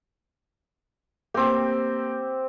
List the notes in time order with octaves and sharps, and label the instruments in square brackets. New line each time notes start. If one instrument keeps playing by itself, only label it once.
[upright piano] A#3 D6 [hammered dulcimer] C4 G4